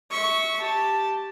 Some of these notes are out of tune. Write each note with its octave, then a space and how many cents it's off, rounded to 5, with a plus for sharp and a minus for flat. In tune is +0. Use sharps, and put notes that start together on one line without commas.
E5 -25 C#6 +0
G4 +0 A5 +0